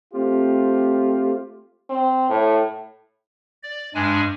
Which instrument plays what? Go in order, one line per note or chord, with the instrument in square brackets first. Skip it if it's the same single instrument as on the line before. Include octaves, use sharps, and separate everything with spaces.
[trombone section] A3 C4 F4 G4
[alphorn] C4
A2
[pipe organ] D5
G2 G#3 D4 G#5